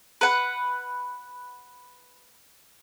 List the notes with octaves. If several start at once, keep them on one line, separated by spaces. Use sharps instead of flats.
B4 F#5